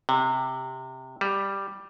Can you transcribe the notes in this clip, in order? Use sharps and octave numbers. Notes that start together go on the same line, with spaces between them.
C3
G3